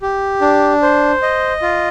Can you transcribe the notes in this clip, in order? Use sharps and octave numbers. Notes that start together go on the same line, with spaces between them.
G4
D4
C5
D#5
F4